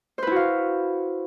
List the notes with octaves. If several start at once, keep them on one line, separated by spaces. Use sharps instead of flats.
E4 F#4 B4 C5 F5